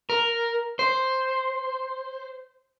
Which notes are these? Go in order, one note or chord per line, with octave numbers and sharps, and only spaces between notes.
A#4
C5